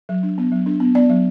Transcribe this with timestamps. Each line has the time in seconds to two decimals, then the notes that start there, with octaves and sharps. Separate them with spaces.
0.09 F#3
0.23 D4
0.38 B3
0.52 F#3
0.66 D4
0.80 B3
0.95 B3 D5
1.09 F#3